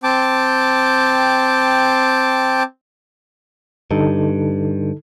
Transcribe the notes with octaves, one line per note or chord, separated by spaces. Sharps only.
C4 G5 A5 D6
G2 D3 D#4 A4